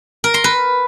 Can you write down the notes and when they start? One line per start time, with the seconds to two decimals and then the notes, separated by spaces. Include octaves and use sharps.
0.24 A#4
0.34 C6
0.44 B4